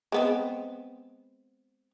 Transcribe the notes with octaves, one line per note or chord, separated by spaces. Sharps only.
G#3 B3 C4